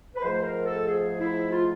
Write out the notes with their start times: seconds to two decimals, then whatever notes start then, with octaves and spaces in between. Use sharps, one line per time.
0.15 B4
0.22 G#2 F3 A3 C5
0.43 A#4
0.65 A4
0.87 G#4
1.20 E4
1.52 F4